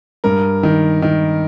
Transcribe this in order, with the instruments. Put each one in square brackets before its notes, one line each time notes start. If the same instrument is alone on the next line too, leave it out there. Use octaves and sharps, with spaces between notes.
[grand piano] G2 A#4
D#3
D#3